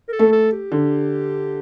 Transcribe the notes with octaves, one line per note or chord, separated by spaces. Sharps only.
A#4
A4
A3
A4
G4
D3